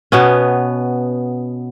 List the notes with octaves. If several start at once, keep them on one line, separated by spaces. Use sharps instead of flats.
B2 B3 C#4